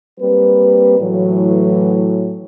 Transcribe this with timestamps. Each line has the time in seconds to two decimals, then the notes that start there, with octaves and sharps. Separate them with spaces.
0.20 G3 A#3 C4 B4
1.00 A2 E3 F#3